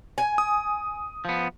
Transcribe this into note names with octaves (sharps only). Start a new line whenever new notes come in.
G#5
D#6
F3 B3